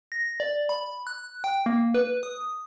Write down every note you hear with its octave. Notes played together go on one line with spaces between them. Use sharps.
A#6
D5
B5
F#6
G5
A#3
B4
D#6